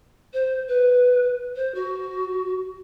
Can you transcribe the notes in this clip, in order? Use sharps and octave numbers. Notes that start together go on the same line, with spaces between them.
C5
B4
C5
F#4